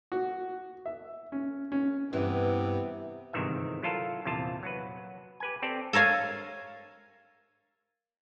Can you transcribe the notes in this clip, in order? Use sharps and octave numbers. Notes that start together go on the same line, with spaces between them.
F#4
E5
C#4
C#4
G2 C3 E3 B3
G1 G#2 C3 D#3 E3 E5
F#3 E4 F4 A4 A#4 F5
A#1 E2 C3 E4 F4 A5
F#3 F#4 B4
G4 B4 G#5
C4 G4 A4 D5
A4 A#4 C#5 F5 G#5